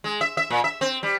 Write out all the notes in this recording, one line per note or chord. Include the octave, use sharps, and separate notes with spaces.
G#3
E5
E5
A#2
E5
C4
G3